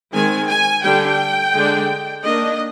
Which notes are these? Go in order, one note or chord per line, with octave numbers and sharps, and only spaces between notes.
D#3 G#3 C4 G#5
G#5
D3 G3 D4 G5
D3 G#3 D4
D#3 A#3 D4 D#5